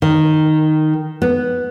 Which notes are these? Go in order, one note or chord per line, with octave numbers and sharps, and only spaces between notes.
D#3
B3